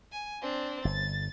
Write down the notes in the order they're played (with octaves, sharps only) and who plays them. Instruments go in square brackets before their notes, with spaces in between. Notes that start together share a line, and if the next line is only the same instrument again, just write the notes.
[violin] G#5
C4 D4
[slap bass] G1 [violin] A6